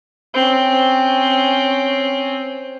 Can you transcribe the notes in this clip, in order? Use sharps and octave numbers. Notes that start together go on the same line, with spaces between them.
C4 C#4